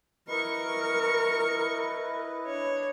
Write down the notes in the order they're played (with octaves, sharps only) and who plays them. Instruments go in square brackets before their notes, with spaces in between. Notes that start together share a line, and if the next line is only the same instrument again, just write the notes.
[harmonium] E4 B4 D#5 [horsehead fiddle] A#4 [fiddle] C#6
[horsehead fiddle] D4 [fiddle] C#5